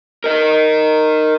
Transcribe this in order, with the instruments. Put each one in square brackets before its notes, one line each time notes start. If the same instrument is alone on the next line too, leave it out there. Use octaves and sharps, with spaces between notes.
[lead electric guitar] A#4 D#5